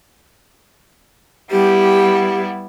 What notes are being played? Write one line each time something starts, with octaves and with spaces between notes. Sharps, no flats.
G3 B3 E4 G4